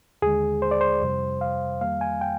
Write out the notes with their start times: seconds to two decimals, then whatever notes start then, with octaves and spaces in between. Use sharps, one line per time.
0.22 D#2 D3 G#3 G#4
0.62 C5
0.71 D5
0.81 C5
1.02 F2 C3 G3
1.41 F5
1.81 F2 D#3 G3 A#3 F5
2.01 G#5
2.21 G5